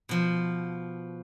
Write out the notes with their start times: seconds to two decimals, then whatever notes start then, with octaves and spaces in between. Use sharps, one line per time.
0.09 B2 F3